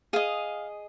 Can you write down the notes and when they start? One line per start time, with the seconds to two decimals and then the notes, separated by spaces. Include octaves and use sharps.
0.13 G#4 D#5 F5